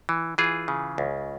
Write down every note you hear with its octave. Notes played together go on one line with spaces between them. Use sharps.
E3
E3 F4 G#4
C#3
C#2